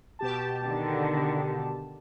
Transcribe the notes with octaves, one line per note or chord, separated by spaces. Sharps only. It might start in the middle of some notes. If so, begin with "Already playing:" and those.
B2 G4 A5
D3 D#3